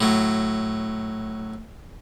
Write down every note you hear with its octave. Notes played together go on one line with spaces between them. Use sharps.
A2 F#3